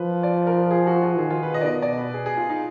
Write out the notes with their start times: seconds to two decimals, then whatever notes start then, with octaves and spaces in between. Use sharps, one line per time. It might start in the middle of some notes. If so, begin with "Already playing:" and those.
Already playing: F3 B4
0.23 D5
0.47 A#4
0.71 G#4
0.87 F#4
1.02 F4
1.18 D#3 G#4
1.30 F4
1.43 B4
1.54 D#5
1.61 D5
1.66 B2 D#5
1.82 D5
1.98 B4
2.14 G#4
2.26 G#4
2.37 F4
2.49 D#4